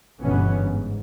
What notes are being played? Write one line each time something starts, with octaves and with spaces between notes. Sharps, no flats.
G1 B2 E3 B3 C#4
G#2